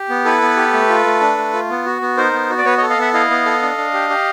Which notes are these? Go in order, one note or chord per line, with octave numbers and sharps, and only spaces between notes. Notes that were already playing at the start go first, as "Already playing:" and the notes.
Already playing: G4
B3
E4 A4 B4
B3
G4
A3
F4
A3
D4
A3
F4
B3
F#4
B3
D#4 A#4 C5
B3
F#4
D5
B3 B4 C#5
C#5 D#5
A4
D#5 F5
B3 E5 F#5
E4 D#5 F5
B3
A4
D4
D4
G4
G4